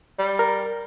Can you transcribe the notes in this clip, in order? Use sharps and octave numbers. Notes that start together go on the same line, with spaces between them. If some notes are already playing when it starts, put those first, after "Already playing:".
G3
A#4